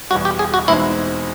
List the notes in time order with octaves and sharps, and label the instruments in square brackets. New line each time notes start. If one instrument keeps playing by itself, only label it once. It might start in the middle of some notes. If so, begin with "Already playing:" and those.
[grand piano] E2 B2 G3 [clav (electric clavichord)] F#4
[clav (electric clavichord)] G4
G#4
F#4
[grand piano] E2 B2 G#3 C4 D#4 [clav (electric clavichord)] E4